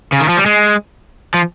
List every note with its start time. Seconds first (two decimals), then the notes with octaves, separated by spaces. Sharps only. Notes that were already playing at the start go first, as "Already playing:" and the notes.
0.12 C#3
0.20 D#3
0.29 F3
0.37 G3
0.46 G#3
1.34 F3